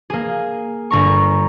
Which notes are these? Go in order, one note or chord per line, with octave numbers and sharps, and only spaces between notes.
A#3 G#4
G1 A#5 C#6